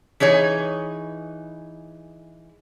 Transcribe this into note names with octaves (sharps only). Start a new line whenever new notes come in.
E3 D#4 G#4 C#5